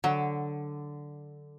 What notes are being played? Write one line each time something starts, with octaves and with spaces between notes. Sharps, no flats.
D3 F#3